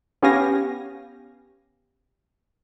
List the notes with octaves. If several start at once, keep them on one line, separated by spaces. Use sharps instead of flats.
B3 C#4 G4 F5 G#5 A#6